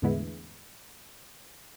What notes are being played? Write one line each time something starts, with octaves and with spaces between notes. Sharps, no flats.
E2 A2 D3 G#3 B3 E4